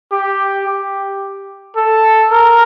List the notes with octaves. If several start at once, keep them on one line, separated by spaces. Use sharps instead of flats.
G4
G4
A4
A#4